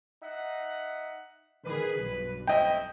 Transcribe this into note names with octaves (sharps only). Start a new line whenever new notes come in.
D#4 E5 F#5
D#3 G#4 B4
B1 G2
A3 C4 E4 D#5 G5